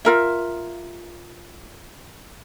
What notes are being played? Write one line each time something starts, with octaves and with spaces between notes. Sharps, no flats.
F4 A#4 E5